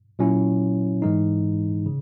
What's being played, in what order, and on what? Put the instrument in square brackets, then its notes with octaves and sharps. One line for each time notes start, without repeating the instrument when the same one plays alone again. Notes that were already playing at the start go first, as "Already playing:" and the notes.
[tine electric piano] A#2 F#3 C#4 E4
G#2 E3 G#3 D#4
C#3